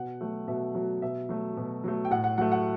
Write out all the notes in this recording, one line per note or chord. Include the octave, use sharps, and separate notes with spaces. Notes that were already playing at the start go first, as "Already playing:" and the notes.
Already playing: B2 F#5
F#3 A3
B2 E5
F#3 A3
B2 E5
F#3 A3
B2
F#3 A3
G5
A2 F#5
F#5
F#3 A3 F#5
F#5